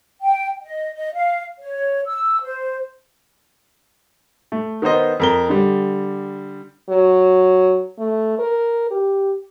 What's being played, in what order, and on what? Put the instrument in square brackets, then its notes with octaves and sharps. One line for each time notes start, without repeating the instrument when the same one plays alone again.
[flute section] G5
D#5
D#5
F5
C#5
E6
C5
[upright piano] A3
D#3 B3 D#4 C5 D#5
F2 A#4 G7
D3 G3
[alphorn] F#3
A3
A#4
G4